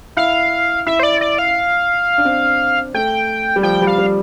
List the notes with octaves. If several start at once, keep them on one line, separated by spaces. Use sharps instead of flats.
E4 F5
E4 E5
C5
D5
D5
F5
D4
C4
A3 G5
G3
F3 G5
G3
F5
G3